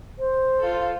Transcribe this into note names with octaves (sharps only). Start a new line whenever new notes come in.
C5
F4 A4